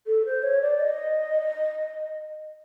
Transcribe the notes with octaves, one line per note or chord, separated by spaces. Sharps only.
A4
C5
C#5
D5
D#5